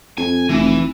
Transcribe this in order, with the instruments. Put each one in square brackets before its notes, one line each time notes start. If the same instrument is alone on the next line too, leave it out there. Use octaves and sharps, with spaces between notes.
[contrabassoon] F2 [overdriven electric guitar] G#5
[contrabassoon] F1 [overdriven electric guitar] E3